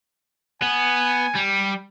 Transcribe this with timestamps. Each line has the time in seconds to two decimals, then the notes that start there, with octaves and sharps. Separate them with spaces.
0.62 B3 G#5
1.36 G3